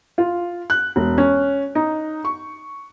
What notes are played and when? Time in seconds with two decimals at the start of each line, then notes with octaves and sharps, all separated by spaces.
0.18 F4
0.70 F#6
0.96 E1
1.18 C#4
1.75 D#4
2.24 C#6